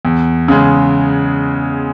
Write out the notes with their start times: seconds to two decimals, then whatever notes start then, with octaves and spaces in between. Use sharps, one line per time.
0.05 E2
0.48 C#3 G#3